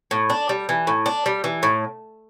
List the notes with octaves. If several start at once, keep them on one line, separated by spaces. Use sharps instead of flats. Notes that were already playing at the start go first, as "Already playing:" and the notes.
A2
D4
G3
E3
A2
D4
G3
E3
A2